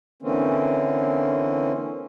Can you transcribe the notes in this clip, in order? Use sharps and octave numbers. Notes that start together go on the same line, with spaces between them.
D3 E3 A#3 C4 C#4